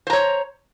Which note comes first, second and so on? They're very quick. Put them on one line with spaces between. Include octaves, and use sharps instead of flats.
C5 A#5 C#5